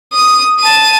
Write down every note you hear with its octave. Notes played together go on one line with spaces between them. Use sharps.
D#6
A5 D#7